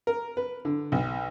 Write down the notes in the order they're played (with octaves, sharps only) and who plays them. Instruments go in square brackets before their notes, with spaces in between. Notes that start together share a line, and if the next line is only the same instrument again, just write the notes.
[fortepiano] A#4
B4
D3
B1